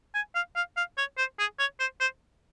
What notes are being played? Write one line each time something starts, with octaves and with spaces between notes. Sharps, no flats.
G#5
F5
F5
F5
C#5
C5
G#4
C#5
C5
C5